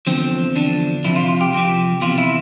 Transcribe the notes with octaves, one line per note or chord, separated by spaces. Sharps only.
E2 D3 F3 C4
E2 D3 F3 D4
F2 C3 F3 E4
F4
F4
G4
F2 C3 F3
E2 C3 E3 F4
E4